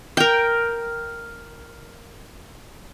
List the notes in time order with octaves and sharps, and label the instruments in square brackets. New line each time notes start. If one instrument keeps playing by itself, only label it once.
[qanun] A#4 G5